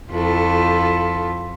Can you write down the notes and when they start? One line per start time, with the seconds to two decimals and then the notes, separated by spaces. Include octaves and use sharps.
0.11 F2 E4 F4 A4